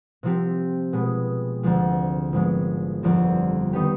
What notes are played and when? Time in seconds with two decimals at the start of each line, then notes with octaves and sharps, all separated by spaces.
0.23 C3 F3 C4 G4
0.93 B2 G#3 B3
1.63 D2 C3 F3 G#3
2.33 G#1 G#2 F3 G#3 B3
3.03 G1 F2 D3 F3 C4
3.73 D#3 B3 D#4 G4